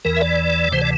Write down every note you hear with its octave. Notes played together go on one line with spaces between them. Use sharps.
E2 E3 A#4
E5
D5
D2 C3 E3 C5
D5